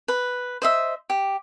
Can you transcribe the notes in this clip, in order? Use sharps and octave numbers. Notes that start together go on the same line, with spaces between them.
B4
C5 D#5 E5
G4